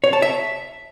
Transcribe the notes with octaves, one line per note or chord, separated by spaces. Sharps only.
C#5
A5
E5